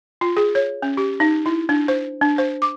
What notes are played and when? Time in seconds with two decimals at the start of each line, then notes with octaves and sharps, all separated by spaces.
0.21 F4
0.37 G#4
0.55 C#5
0.82 C#4
0.97 G4
1.20 D#4
1.46 E4
1.69 D4
1.88 C5
2.22 D4
2.38 C5
2.62 D6